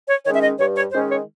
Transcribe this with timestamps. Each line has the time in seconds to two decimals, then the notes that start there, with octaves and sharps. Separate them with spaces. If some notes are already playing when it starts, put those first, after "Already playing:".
0.09 C#5
0.26 D#3 G#3 C#4 C#5
0.36 E5
0.43 D#5
0.60 G2 C#5
0.76 C#5
0.93 D#3 G#3 C#4 C5
1.10 C#5